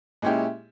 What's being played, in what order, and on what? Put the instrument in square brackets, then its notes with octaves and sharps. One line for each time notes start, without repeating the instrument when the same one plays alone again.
[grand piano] A#2 G#3 C#4 E4 G4